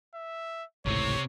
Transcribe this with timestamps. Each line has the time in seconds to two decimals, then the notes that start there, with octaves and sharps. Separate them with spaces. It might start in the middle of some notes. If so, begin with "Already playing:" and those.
0.14 E5
0.86 G#1 C#2 A2 C3 C4 C#5